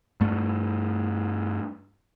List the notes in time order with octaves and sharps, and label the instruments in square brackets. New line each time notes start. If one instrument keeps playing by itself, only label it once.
[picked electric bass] G2 A3